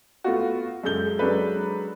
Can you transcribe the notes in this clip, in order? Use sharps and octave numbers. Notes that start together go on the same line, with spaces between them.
A3 B3 F4 F#4
F#2 G#3 A4 G6 G7
F#3 G#3 D4 A4 B4